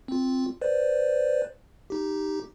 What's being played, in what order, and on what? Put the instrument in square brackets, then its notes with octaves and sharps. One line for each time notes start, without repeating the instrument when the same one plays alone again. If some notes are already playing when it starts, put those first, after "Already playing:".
[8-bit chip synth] C4 F4
B4 C5 D5
D#4 G4